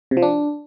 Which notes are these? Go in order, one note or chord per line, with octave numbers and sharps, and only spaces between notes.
C3
F3
D4